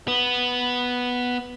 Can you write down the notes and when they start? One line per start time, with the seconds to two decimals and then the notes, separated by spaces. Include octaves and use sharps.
0.08 B3